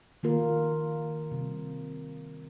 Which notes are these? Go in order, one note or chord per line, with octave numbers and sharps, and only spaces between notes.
D#3 A#3 F4 A#4
C3 G3 C4